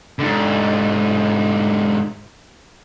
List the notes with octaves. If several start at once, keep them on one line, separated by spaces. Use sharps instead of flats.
G#2 D3